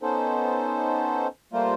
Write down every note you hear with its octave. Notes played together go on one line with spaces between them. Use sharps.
B3 C#4 D#4 A4 C5
G3 A3 A#3 F4 A#4 C5